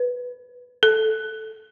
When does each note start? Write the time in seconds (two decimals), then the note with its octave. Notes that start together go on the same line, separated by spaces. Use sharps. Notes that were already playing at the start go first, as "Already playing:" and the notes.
Already playing: B4
0.83 A4